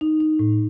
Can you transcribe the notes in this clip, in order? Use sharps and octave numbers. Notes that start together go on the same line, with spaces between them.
D#4
D#4
A2